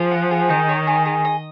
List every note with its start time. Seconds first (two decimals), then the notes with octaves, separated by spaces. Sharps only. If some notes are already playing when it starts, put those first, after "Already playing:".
Already playing: F3 G#4
0.11 F#5
0.31 G#4
0.50 D#3 D#4
0.68 C#5
0.87 G#4
1.06 G#4
1.25 D#5